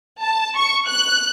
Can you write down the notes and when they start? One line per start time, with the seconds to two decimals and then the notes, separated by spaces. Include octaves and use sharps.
0.21 A5
0.56 C#6
0.87 F#6